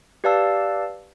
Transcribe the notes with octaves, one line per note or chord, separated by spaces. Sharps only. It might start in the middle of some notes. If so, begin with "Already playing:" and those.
G4 B4 D5 F5 A5 E6